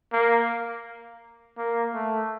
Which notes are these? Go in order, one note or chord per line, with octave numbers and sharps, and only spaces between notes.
A#3
A#3
A3